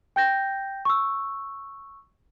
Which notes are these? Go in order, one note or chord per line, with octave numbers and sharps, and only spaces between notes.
G5 G6 A#6
C#6 E6